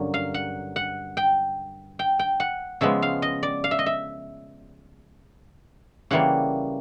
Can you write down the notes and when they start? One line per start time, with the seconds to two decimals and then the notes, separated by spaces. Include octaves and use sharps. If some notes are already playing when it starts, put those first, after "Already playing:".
Already playing: G2 D3 F#3 A#3 C#4
0.14 F5
0.34 F#5
0.76 F#5
1.17 G5
1.99 G5
2.19 G5
2.40 F#5
2.81 C#3 F3 G#3 B3 E5
3.02 F5
3.22 D#5
3.43 D5
3.64 F5
3.71 E5
3.79 D#5
3.86 E5
6.11 C#3 E3 G3 A#3 F#5